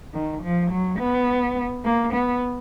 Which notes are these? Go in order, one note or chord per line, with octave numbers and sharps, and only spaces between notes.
D#3
F3
F#3
B3
A#3
B3